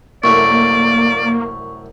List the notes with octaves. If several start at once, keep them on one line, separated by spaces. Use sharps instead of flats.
C2 F#2 A3 A#3 D5 C#6